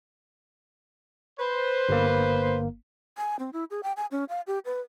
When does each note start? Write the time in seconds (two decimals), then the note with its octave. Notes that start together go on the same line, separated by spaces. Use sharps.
1.39 B4 C5
1.89 G1 A#3
3.17 G#5
3.39 C4
3.53 E4
3.70 G#4
3.83 G5
3.97 G#5
4.11 C#4
4.29 F5
4.47 G4
4.65 B4